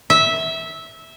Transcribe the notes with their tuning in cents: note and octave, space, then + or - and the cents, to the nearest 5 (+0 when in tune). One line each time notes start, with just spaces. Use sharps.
E5 -15